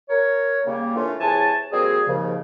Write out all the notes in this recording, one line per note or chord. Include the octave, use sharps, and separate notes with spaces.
A#4 C#5
C#3 G3 A#3
E3 A3 A#3 C#4 D4 F4
C3 E3 G#4 C#5 G#5 A5
F3 G3 A#3 C4 F#4 G#4
D#2 G#2 C#3 F3